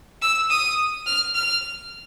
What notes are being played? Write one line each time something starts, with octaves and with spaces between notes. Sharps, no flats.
E6
D#6
F6
F6